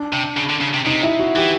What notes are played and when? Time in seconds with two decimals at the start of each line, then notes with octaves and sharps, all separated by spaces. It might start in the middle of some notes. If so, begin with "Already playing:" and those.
Already playing: D4
0.13 C3
0.37 C#3
0.50 D3
0.61 C#3
0.74 C3
0.86 C3 D#4
1.03 E4
1.19 F#4
1.36 E3 G4